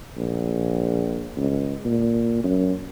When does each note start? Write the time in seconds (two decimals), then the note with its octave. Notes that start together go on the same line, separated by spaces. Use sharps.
0.17 A#1
1.37 C#2
1.86 A#2
2.44 F#2